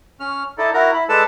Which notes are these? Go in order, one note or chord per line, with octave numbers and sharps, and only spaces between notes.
C#4 F6
D#4 E4 A4 D5
E4 F#4 A#4 A#5
E4 B5
G#3 A4 B4 D5 A5 E6